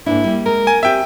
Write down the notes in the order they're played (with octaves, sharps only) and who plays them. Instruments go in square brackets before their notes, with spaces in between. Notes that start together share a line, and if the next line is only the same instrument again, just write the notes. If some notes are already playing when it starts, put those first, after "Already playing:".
[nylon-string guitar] G#2 A#3 D4 [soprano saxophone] E4
[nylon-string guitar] G3 A#3
[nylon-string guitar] G#3 [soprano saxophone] A#4
[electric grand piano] G#5
[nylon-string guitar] C4 G4 [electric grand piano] E5 G5